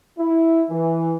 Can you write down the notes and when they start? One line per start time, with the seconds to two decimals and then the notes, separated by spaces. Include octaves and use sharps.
0.19 E4
0.71 E3